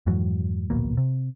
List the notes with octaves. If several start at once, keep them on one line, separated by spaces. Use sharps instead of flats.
F2 G#2 E3 F#3
D1 A#1 B2 A#3
C3